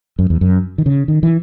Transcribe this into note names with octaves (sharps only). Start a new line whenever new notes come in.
F#2
E2
F#2
D#3
C#3
D#3
E3